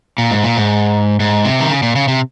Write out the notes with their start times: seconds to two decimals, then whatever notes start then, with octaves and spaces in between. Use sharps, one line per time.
0.18 A#2
0.31 G#2
0.44 A#2
0.57 G#2
1.20 G#2
1.45 C3
1.60 D#3
1.70 C#3
1.83 A#2
1.95 C#3
2.08 C3